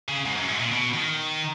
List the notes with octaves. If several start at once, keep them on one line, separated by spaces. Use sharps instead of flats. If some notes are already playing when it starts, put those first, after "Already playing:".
C#3
G#2
F#2
G#2
A#2
B2
D#3